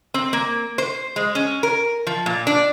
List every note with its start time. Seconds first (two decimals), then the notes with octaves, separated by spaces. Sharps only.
0.14 C4
0.33 A#3
0.78 C5
1.16 G#3
1.35 C#4
1.63 A#4
2.07 F3
2.26 A#2
2.47 D4